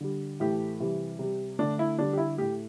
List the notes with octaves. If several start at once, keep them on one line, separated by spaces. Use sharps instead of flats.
D3 G3
A2 E3 A3 G4
C3 E3 G3
C3 G3
D3 A3 D4
E4
D3 G3 D4
G4
E4
A2 A3 G4